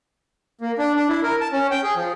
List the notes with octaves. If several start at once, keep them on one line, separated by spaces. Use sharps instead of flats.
A#3
D4
D4
E4
A#4
A5
C#4
G5
G#4
F3